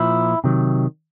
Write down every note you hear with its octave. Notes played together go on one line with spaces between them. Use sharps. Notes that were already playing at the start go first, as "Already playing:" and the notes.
Already playing: A#2 F3 E4
C3 D#3 F#3